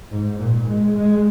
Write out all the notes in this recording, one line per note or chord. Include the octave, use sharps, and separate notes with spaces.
G#2
A#2
G#3
G#3